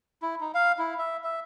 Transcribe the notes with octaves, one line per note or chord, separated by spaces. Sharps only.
E4
D#4
F5
E4
E5
E5